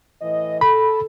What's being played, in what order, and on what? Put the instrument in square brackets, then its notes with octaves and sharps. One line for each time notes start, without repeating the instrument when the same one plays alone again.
[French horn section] A2 E3 D#5
[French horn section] A4 [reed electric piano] B5